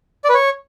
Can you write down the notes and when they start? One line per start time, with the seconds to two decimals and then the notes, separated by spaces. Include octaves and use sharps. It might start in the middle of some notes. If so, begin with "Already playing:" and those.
0.24 D5
0.29 B4
0.34 C#5